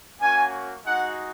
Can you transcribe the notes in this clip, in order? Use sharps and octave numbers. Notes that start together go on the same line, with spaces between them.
A#3 C#4 F#4 G#5
G#3 D#4 F#4 F#5